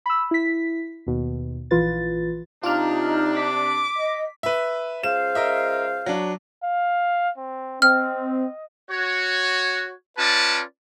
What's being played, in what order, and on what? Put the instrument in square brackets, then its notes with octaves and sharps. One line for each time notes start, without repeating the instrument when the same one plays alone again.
[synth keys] B5 E6
E4 B6
D#2 B2
A#1 E3 F4 B4 A6
[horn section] C3 D4 [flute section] D#4 [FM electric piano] F4 D6 F6
[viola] D6 [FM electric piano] B6
[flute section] D#5
[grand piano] B4 E5
[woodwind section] C#2 C5 F5 [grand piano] E7
[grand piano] A#4 D#5 E5
F#3 D4
[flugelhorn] F5
C4
[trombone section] C4 [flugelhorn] D#5 [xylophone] F6
[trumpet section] F#4 C#5
C#4 F4 B4 D5 A5